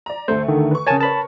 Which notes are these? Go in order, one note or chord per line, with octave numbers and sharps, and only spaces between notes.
D5 A#5
D2 A3 C5
D3 D#3
B4 C#6
C#3 A#4 C#5 G#5 A5
A#4 B4 C#5 A5 B5